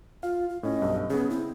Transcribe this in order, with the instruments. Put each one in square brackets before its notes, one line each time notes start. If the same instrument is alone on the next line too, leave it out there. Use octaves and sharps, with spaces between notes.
[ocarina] F4 [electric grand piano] F5
[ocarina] F4
[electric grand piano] A2 C#4 [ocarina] D#5
[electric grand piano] B1 G2
[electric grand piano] C#3 B3 [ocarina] G#4
[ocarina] C4 [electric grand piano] E4